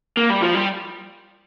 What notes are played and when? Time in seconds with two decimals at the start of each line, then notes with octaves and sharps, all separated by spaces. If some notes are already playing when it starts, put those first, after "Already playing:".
0.17 A#3
0.30 G3
0.42 F3
0.55 G3